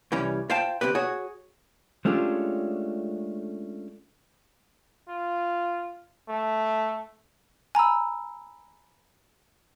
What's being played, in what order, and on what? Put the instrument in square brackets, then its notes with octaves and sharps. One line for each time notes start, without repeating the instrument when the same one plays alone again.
[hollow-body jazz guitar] C2 E3 G3 C#4
F4 C5 F5 G5 A5
D3 F3 C4 G4 B4
F#4 G#4 C#5
G#3 A3 C#4 D4 F4 G4
[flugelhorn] F4
A3
[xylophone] G#5 A#5 B5 E6